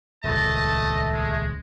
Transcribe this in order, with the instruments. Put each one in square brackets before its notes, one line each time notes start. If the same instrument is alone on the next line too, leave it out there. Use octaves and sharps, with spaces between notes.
[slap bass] D#1 C#2 [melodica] A3 [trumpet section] D#5 A5
[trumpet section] G#3